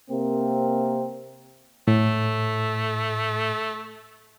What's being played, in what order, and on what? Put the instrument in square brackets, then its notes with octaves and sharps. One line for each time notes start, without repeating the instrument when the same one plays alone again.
[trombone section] C3 A#3 C4 A#4
[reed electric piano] A2 [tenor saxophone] A3